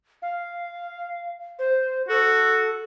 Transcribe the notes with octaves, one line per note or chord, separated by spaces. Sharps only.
F5
C5
F#4 A4